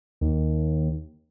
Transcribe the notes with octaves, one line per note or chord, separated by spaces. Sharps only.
D#2